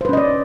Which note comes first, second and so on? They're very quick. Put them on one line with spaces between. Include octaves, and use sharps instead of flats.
C5 B4 C#4 D#5 D5